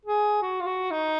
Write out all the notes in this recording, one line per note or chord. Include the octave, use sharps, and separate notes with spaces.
G#4
F#4
F4
F#4
D#4